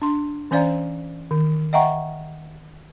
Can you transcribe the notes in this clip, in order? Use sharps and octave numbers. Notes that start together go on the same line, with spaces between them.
D4 C6
E3 C#4 C5 D5 F5 A#5
D#3
D#5 E5 F#5 G5 A#5 C#6